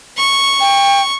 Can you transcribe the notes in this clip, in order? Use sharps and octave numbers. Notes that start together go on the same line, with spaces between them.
C#6
G5